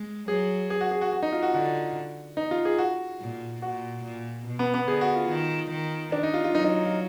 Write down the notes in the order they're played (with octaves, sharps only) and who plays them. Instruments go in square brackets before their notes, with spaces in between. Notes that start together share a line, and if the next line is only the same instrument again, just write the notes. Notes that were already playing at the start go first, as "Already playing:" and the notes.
Already playing: [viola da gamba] G#3
[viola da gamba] F#3 [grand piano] G#4
[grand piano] G#4
F#4
G#4
F#4
F#4
D#4
F4
F#4
[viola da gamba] D3 [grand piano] F#4
[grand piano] D#4
F4
G#4
F#4
[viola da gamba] A#2
[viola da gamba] A#2 [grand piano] F#4
[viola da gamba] A#2
B2
[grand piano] B3
B3
[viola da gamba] D3 [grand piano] G#4
[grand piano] F#4
F4
[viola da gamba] D#3
D#3
[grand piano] D4
D#4
F4
F4
[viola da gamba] F#3 [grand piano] D#4
[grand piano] D#4
F4